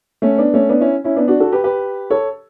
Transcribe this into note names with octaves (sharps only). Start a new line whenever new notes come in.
A3 C#4
B3 D4
A3 C#4
B3 D4
C#4 E4
C#4 E4
B3 D4
D4 F#4
F#4 A4
G4 B4
G4 B4
A4 C#5